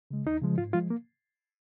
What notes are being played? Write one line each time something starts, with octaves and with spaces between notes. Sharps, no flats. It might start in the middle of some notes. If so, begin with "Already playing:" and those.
C#3 G#3
D#2 D#4
C#3 F3 G#3
G#2 F4
F3 G#3 F4
A#3